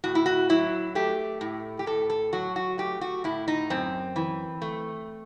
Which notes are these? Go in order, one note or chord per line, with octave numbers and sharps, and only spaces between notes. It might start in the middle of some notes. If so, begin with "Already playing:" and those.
A2 F#4
E4
F#4
F#3 E4
A3 G4
A2
G4
A2 A4
A4
F#3 F#4
F#4
A3 G4
F#4
A2 E4
D#4
F#2 C4
E3
A3